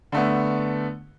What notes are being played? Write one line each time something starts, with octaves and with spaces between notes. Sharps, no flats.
D3 A3 B3